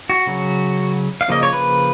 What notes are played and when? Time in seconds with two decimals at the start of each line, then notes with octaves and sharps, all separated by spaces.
0.10 F#4
0.27 C#3 F#3 C#4
1.21 F5
1.28 C#3 F3 A#3 D#5
1.43 C#5
1.53 B4